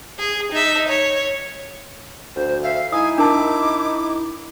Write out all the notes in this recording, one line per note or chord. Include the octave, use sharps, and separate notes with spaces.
G#4
D#4 E5
C#5
D2 C5
E5 F5
D#4 E4 G#5 D#6
D4 A#4 A5 D6